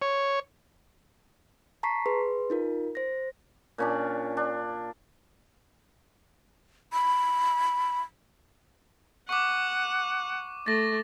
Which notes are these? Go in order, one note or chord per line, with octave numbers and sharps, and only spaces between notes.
C#5
A5 A#5 C#6 B6 C7
G#4 B4 C6
D#4 F4 A#4
C5 A#6
A#2 C#4 D4
D4
B5
F#5 C#6 D6
A3 A6 A#6